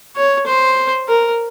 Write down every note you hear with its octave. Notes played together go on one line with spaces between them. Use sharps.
C#5
C5
A#4